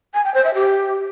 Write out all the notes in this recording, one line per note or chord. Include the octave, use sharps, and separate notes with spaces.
G#5
G5
C5
E5
G4